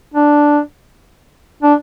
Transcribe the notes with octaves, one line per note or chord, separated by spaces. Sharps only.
D4
D4